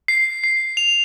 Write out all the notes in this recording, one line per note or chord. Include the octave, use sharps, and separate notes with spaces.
C7
C7
F7